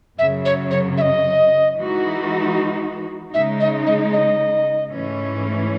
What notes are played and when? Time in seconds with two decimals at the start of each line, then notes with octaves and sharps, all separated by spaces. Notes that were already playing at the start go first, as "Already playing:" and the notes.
0.19 F#2 C#3 F#3 E5
0.45 C#5
0.71 C#5
0.98 E5
1.01 D#5
1.76 E3 G#3 D#4 F#4
3.33 C#3 G#3 D#4 E5
3.60 D#5
3.86 D#5
4.13 D#5
4.91 G#2 E3 A3 C#4